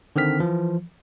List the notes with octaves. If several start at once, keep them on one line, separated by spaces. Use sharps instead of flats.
D3 D#3 C4 F6 B6
E3 F3